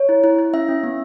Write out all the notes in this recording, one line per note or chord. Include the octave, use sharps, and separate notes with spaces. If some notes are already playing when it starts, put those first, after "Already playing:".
Already playing: C#5
E4
E4
E4
C#4 E5
C#4
B3